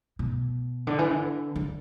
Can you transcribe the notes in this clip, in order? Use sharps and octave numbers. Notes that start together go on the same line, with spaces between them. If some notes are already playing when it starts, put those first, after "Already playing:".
B2
D3
E3
D3
D3